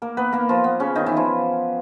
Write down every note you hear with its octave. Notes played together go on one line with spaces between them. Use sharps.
A#3 A#4
B3 B4
A#3 A#4
F3 F4
B3
C#3 C#4
D#3 D#4
E3 E4
F3 F4